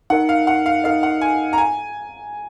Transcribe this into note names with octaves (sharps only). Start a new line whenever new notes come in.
D#4 A#4 D#5 F#5
F5
F#5
F5
D#4 A#4 D#5 F5
F#5
G#5
A#5
G#5